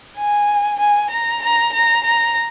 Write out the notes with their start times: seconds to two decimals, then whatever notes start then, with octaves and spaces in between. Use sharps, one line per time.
0.17 G#5
0.79 G#5
1.10 A#5
1.41 A#5
1.73 A#5
2.03 A#5